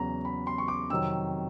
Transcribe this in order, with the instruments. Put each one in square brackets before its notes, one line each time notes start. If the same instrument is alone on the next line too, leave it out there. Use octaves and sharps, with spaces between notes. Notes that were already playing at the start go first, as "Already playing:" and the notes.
Already playing: [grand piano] E2 C#3 F#3 A#5
B5
C6
C#6
D6
F2 C3 D#3 F#3 E6